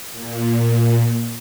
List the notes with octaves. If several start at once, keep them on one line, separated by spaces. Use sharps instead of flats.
A#2